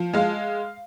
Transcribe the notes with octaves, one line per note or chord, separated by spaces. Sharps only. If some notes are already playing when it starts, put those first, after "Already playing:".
Already playing: F3
G#3 F5